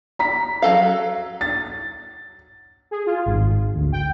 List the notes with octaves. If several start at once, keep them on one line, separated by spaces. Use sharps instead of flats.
A#5 B6
F#3 A4 F5
A6
G#4
F4
G#1
D2
G5